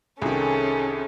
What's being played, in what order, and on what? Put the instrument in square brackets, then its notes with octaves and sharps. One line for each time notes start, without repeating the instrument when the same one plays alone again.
[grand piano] C2 D#3 [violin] C#4 A4 [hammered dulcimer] G#4